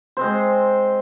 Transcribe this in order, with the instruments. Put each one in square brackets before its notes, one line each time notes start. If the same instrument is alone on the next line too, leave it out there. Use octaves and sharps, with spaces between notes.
[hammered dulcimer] G#3 C4 C5